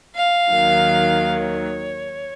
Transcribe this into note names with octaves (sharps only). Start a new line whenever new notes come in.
F5
D#2 D#3 F#3
C#5